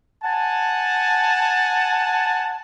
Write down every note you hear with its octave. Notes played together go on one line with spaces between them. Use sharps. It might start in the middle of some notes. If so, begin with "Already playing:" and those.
F#5 G#5 A5